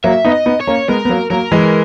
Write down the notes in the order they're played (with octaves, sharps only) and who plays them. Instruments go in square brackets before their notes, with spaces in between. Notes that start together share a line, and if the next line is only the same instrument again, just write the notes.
[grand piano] F#3 A#3 [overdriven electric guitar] E5
[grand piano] B3 D#4
[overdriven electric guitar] D#5
[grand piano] B3 D#4
[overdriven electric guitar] C#5
[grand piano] A#3 C#4
[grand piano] G#3 B3 [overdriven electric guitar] A#4
[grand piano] B3
F#3 A#3
[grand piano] F#3 A#3 [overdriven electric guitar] A#4
[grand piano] E3 G#3